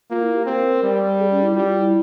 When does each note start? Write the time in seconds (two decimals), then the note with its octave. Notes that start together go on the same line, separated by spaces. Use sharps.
0.10 A#3 F4
0.22 E4
0.34 G4
0.45 C4 A#4
0.82 G3
1.19 G#4
1.31 C#4
1.43 E4
1.54 G3 F4
1.67 F4
1.79 E4